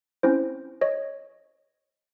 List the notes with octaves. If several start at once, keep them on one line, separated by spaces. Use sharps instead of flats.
C4 C#4 E4 C5
C#5 D#5